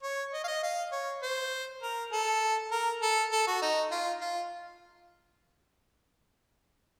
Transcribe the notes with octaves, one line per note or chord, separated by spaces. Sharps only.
C#5
D#5
F5
D#5
F5
C#5
C5
A#4
A4
A#4
A4
A4
F#4
D#4
F4
F4